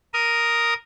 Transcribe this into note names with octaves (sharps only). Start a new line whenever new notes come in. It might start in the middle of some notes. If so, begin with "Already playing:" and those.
A#4 D#6